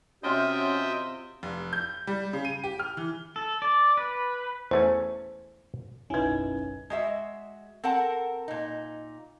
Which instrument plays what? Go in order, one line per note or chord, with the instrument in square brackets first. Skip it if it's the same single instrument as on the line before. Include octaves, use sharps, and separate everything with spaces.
[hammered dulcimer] C3 F4 C6 [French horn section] C#4 F#4 [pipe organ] D#5 E5 G5
[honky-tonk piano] F1
G6
G3
C#3
D#7
G4
F6
E3
[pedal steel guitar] A4
D5
B4
[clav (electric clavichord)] E2 A3 C#4 [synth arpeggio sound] C5
[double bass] F#1 B1 [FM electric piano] C#4 D#4 [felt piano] E4 G#6 [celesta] B4 G#5
[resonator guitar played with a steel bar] G#3 F#4 E5
C4 A4 A#4 F#5 A5
A#2 D#4